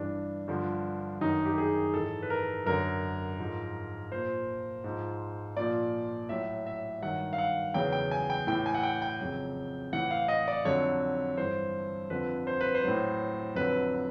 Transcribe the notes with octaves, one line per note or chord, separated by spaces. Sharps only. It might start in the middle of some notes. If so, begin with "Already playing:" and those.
Already playing: G2 E3 D4
G2 D3 F3
F#2 D#3 F#3 D#4
G4
G#4
G#2 E3 A4
B4
A#4
F#2 D3 F#3 A#4
G#2 F3
A#2 F3 C5
G#2 F3
A#2 F3 D5
A2 F#3 E5
E5
G2 D#3 F#3 F#5
F5
F#5
E2 C#3 F#3 G5
G5
G#5
G5
A2 E3 G5
G#5
F#5
G5
G5
F2 C#3 F#3
A2 E3 F#5
F5
D#5
D5
F2 D3 F#3 C#5
G2 E3 C5
F2 D3 F3 B4
C5
B4
C5
A2 F#3
F2 D3 F#3 B4